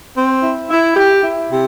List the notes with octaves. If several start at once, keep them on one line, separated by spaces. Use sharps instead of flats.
C4
E4
E4
G4
E4
C3